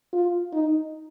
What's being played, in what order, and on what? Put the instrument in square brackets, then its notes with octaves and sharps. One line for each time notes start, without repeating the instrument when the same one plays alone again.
[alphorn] F4
D#4